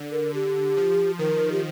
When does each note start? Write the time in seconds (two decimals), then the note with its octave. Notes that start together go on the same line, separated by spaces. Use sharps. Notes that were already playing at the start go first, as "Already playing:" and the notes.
Already playing: D3
0.12 A#4
0.33 D3 G4
0.77 F3
1.19 D#3 A#4
1.52 G4